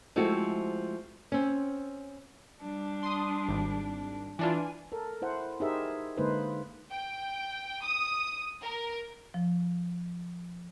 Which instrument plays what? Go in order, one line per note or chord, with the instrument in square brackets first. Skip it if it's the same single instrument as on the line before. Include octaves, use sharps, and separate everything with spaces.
[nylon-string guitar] F3 G#3 A3 C4 E4 F#4
C4 C#4
[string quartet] G3 D4
[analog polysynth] C6 D#6
G#1
[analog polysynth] E3 D4 F4 [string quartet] G#5
[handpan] A4 A#4
E4 C5 F#5
D#4 G4 G#4 A#4 C5 E5
D3 G#3 A#3 D#4 B4 C5
[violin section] G5
D#6
A#4
[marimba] F3